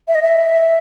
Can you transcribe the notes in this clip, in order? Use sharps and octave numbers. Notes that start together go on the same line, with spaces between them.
E5
D#5
E5